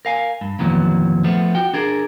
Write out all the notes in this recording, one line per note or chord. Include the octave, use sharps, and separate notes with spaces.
A#4 F5 G#5
G2
F2 A#2 D#3 E3 F#3 B3
F3 A3 B3
F#4 G5
D4 G#4 A#4